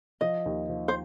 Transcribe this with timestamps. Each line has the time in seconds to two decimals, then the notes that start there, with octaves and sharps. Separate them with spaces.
0.21 F3 D#5
0.46 D#2
0.69 F3
0.88 C5